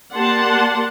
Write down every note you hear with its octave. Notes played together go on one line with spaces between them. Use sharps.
A#3 G4 D5 F#5 A5 C6